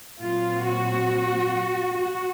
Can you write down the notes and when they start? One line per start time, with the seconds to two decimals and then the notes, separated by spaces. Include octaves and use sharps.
0.21 A#2 F#3 C4 F4
0.65 F#4
1.97 F#4